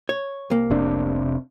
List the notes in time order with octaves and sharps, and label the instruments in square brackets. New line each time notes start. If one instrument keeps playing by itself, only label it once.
[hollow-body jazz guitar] C#5
C2 A#3
[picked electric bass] F1 C3 D4